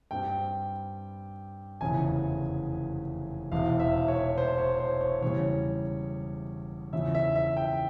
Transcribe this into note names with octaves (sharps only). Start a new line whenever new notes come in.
G2 G3 C4 G5
F1 E2 C#3 E3 G#5
E1 E2 C3 F5
E5
C#5
C5
C#5
C5
C#5
E2 C#3 G3 C#5
E2 C#3 F3 E5
E5
E5
G5